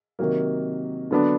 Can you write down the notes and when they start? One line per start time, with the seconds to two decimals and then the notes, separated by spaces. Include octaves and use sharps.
0.19 C3 D#3 F#3 A#3
1.11 D3 F#3 B3 D4